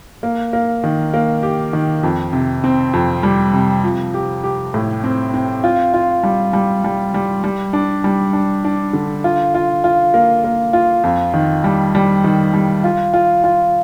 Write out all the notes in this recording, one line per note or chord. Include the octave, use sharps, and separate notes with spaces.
A#3
A#3
D#3
A#3
G4
D#3
F2
C3
C4
F2
G3
C3
F3
G4
G4
A2
C4
C4
F4
F4
G3
G3
G3
G3
G3
D4
G3
D4
D4
D3
F4
F4
F4
A#3
A#3
F4
F2
D#3
G3
G3
D#3
G3
F4
F4
F4